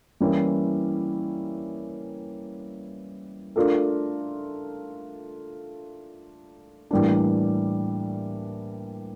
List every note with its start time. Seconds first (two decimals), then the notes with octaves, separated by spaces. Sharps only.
0.20 E3 G3 A#3 C#4 E4
3.56 A3 D4 F4 A#4
6.91 A2 E3 G3 A#3 D4